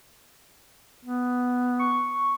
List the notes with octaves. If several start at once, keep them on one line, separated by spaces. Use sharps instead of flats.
B3
C#6